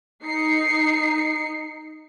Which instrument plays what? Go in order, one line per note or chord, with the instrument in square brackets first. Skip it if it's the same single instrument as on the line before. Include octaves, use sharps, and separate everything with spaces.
[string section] D#4 C7 C#7